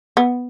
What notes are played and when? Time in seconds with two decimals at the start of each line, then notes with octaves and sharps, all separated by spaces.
0.17 B3